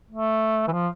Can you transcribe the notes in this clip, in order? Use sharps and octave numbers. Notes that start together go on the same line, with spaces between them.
A3
E3
F3